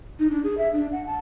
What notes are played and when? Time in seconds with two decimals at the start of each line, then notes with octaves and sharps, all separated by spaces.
0.19 D#4
0.31 D4
0.44 G#4
0.58 E5
0.73 D4
0.92 F#5
1.07 A5